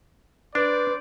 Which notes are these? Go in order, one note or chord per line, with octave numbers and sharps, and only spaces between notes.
D4 B4 C5 D5